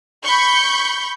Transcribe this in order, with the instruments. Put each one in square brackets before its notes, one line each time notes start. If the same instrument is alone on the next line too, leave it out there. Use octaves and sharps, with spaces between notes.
[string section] B5 C#6 G6